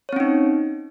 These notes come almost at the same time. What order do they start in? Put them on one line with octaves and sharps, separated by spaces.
C#5 C4 C#4 D#4